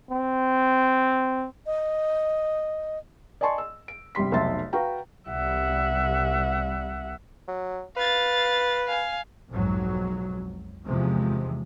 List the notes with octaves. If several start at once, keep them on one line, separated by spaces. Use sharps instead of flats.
C4
D#5
D5 D#5 G#5 A5 C6 C#6
E6
D7
G1 C3 G3 C6 B6
F1 B1 D#4 E5 C6 A6
F#4 B4 F5 G5 A#5
C2 G3 E5 F#5
F#3
B4 F5 A6
F5 G#5
B1 F2 G#2 F#3
E2 C3 D#3 F3 G#3